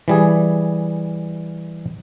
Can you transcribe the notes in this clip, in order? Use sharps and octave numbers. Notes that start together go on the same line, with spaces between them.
E3 G3 G#4